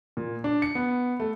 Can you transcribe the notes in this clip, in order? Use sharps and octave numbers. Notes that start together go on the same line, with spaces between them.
A#2
D4
C#7
B3
A3